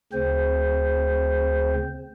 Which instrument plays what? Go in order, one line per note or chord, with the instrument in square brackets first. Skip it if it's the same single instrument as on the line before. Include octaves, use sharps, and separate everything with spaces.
[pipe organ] D2 C#3 C4 C5